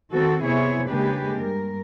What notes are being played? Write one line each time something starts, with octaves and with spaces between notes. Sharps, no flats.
D#3 C4 F#4 A4
C3 B3 E4 G#4 C#5 E5
C#3 G#3 A#3 D4 G4 B4
G2 A#4